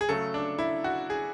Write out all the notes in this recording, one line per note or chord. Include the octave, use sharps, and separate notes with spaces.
G#4
C#3 F#3 A3 A4
D4
E4
F#4
G#4